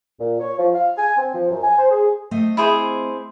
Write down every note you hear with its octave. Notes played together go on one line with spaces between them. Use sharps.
A#2
C#5
F3
F5
G#5
C4
F3
F#2
G#5
C5
G#4
A3 C4 D#5
E4 G#4 C5